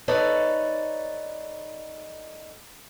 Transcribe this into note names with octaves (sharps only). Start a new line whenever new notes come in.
D#4 A4 B4 C#5 D5